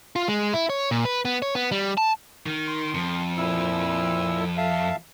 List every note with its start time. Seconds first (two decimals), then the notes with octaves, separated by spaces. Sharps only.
0.16 F4
0.28 G#3
0.53 E4
0.70 C#5
0.91 A#2
1.05 B4
1.25 B3
1.42 C#5
1.55 B3
1.72 G3
1.98 A5
2.46 D#3
2.67 C6
2.94 F2
3.38 A#2 E4 E6
4.57 E5 F5 A5